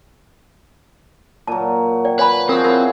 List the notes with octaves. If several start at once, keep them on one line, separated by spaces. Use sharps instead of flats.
A#2 F#3 A5
D5 G5
B4 D5 G#5 B5
F3 C4 F#4 G#4 A#4
E4 A#4 B4 C#5